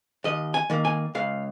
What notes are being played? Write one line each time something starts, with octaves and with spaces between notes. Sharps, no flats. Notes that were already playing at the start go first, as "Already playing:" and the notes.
D#2 D#5
G#5
D#3 A#3
G#5
C#2 F5